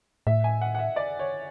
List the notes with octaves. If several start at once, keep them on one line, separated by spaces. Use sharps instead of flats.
A2 E5
G#5
F#5
F#5
E5
D5
C#5